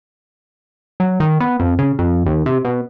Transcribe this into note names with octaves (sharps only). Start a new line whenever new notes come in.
F#3
D#3
B3
F2
C#3
F2
D#2
C3
B2